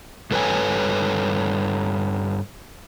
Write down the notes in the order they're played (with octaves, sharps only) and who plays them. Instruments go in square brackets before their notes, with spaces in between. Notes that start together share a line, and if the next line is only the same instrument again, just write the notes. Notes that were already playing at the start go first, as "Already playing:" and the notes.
[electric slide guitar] G2 A4 B4 C#5 G#5